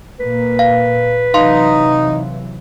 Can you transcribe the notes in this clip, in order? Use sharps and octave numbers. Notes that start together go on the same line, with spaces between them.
A#2 A#3 B4
F5
C3 E3 F#3 D#4 F5 C6